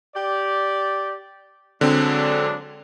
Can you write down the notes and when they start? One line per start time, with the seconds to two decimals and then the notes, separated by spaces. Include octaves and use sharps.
0.16 G4 D5
1.81 D3 F#3 G#3 C4 D4